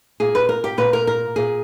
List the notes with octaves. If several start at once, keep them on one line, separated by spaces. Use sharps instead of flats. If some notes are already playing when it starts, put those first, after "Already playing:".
A#2 G#4
B4
A#4
G4
A#2 B4
A#4
A#4
A#2 G#4